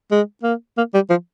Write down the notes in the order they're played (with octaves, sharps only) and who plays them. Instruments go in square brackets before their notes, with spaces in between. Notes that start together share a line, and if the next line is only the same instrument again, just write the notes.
[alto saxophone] G#3
A#3
A#3
G3
F3